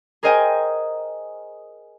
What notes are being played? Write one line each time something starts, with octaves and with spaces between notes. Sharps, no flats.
G#4 A#4 C5 D#5 G5 G#5